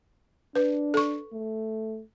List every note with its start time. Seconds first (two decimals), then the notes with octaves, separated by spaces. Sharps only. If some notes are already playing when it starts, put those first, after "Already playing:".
0.55 D4 B4
0.94 A4 C#6
1.33 A3